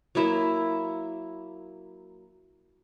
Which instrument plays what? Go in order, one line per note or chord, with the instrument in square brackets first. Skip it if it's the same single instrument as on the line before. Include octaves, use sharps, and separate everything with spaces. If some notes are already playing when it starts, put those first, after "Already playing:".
[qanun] F#3 A#3 E4 E5